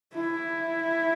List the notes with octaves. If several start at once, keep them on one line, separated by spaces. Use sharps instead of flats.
E4